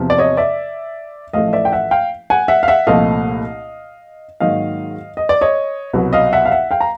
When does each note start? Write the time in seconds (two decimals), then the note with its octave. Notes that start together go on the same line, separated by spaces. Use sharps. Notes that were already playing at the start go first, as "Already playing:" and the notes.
Already playing: E2 C3 F3
0.10 D5
0.18 C#5 D#5
0.37 D5 E5
1.33 A1 A2 F3 A3 D#5 F5
1.53 D5 E5
1.65 G5
1.72 E5 F#5
1.91 F5 G5
2.30 F#5 G#5
2.48 E5 F#5
2.63 F5
2.68 E5 F#5
2.87 C2 A#2 F3 A3 D#5 F5
4.40 G#2 D#3 F#3 A#3 D#5 F5
5.17 D#5
5.29 D5
5.41 C#5 D#5
5.93 C2 B2 F#3 B3
6.13 D#5 F5
6.33 E5 F#5
6.46 F5
6.51 E5 F#5
6.71 F5 G5
6.81 A#5